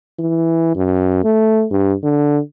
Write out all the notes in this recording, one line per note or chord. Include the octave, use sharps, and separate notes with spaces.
E3
F#2
A3
G2
D3